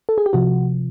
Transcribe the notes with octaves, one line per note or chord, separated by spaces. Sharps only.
A4
G#4
G4
C3 F3 F#4